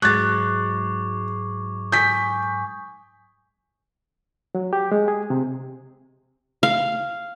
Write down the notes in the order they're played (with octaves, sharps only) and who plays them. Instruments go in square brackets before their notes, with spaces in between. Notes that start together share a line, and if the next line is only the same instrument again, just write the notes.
[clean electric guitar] G#2 F#3 G#3 [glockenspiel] C#6 D6 G#6 [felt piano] F#6 A6
[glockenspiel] G#5 C#6 D#6 [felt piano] G6 B6
[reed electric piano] F#3
G4
G#3
G#4
C3
[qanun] F5